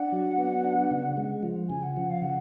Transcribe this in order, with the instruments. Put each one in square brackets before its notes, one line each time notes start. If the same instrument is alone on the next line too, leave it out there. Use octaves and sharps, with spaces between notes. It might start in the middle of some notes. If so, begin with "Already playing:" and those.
Already playing: [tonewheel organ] D4 [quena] F#5
[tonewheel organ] F#3
B3
D4
C#3
G#3
F3
[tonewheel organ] C#3 [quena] G#5
[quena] F#5
[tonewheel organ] F3
[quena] F5
[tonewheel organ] C#3 [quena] F#5